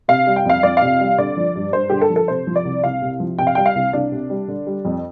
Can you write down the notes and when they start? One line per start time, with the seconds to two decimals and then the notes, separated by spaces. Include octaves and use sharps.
0.08 C3 F5
0.27 G3
0.36 G5
0.45 F2 F5
0.63 F2 D5
0.77 C3 F5
1.00 G3
1.18 D3 D5
1.37 F3
1.56 G2
1.73 G2 C5
1.90 D3 G4
2.01 A4
2.10 F3
2.16 A4
2.28 C3 C5
2.47 F3
2.56 D5
2.65 C2
2.84 C2 F5
3.02 C3
3.20 F3
3.38 C3 G5
3.47 F5
3.55 G3 G5
3.66 F5
3.75 C2
3.93 C2 D4
4.12 C3
4.30 G3
4.48 D3
4.67 G3
4.85 F2